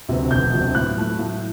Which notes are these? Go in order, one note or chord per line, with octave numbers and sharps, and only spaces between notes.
D2 C3 F#3 B3
E1 G6
D2 C3 F#3 B3
A2 F#6
F#3 A3 E4
A2